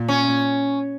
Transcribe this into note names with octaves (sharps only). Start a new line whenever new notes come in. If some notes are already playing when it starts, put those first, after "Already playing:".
Already playing: A#2
C#4